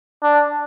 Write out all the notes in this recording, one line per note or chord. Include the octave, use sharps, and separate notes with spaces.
D4